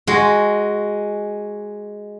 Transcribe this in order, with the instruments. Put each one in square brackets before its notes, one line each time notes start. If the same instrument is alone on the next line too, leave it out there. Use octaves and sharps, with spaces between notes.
[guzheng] G#3 F#4